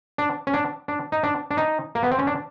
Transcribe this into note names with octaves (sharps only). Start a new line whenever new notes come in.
D4
C#4
D4
D4
D#4
D4
D4
D#4
A#3
B3
C4
C#4
D4